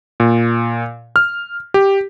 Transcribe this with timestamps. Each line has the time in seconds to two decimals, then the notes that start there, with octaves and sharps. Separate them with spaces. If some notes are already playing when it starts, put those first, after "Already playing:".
0.20 A#2
1.16 F6
1.74 G4